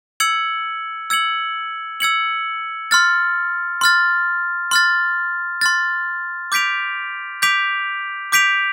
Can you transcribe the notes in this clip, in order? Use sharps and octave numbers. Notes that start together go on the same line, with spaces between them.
E6 G#6 C#7 F#7
E6 G#6 C#7 F#7
E6 G#6 C#7 F#7
C6 F6 A6
C6 F6 A6
C6 F6 A6
C6 F6 A6
D6 G6 B6 D7 F7
D6 G6 B6 D7 F7
D6 G6 B6 D7 F7